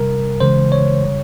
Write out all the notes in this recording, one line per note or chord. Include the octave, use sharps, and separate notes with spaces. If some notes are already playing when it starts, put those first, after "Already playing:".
Already playing: C3 G3 A#4
C#3 E3 G#3 C5
C#5
C#3 G3